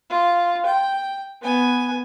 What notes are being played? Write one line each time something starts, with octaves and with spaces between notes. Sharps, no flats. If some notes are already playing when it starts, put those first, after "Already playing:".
F4
G5
B3 G#5